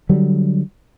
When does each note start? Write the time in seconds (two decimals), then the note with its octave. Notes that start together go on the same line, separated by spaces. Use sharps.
0.09 D3 F#3 G3